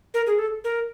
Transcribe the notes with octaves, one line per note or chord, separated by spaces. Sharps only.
A#4
G#4
A4
A#4